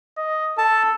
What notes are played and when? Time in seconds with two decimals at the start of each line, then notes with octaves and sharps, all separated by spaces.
0.17 D#5
0.58 A4 A5